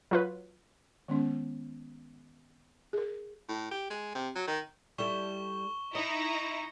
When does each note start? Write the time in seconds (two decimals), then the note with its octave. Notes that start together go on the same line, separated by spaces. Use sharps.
0.11 F#3 F4 B4
1.08 D#3 G#3 B3 C#4
2.93 G#4 A#4
3.49 A2
3.71 G4
3.90 G#3
4.15 C3
4.36 F#3
4.48 D#3
4.98 G3 E4 A4 C#6 E7 G7
5.95 D#4 E4 D#5 A#5 C#7